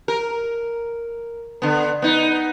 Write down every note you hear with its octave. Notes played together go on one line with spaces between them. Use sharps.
A#4
D3 B3
B3 D#4